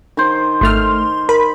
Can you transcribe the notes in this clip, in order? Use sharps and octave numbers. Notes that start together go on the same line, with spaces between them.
D#3 C5
G#1 A3 C6 F6
A#4 B5